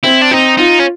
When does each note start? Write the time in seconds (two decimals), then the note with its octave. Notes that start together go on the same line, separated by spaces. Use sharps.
0.04 C4 E4
0.22 D4
0.31 C4 D#4
0.58 D#4 F4
0.80 C#4